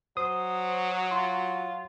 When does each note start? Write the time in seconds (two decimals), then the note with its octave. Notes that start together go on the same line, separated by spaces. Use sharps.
0.17 F#3 C5 D#6
1.11 F4 C6